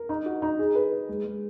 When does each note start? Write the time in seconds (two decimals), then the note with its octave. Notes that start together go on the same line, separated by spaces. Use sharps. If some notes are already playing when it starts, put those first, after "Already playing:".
Already playing: A#4
0.09 D#4
0.26 F#4
0.42 D#4
0.59 G#4
0.75 B4
0.92 B4
1.09 G#3
1.25 G#3